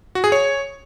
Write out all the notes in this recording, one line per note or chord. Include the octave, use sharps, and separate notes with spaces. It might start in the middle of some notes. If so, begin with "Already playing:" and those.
F#4
G#4
C#5